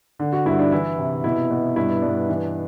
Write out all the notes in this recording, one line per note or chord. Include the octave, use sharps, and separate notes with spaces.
D3
F#4
G2 E4
D4
E3 E4
C3
B2 E4
B2
G2 E4
G2 D4
E3